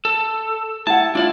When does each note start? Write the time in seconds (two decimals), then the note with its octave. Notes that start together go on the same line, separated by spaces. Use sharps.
0.05 A4
0.87 E4 F#5 A5
1.15 D4 E4 F4 D5